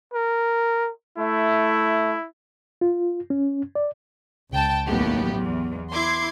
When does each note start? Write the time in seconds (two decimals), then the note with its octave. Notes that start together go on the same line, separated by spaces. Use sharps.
0.14 A#4
1.18 A3 E4
2.81 F4
3.30 C#4
3.75 D5
4.51 C#2 G5 A5
4.86 A1 D#2 A2 F#3 B3 G4
5.36 E2
5.91 E4 C6 D6 G#6 C7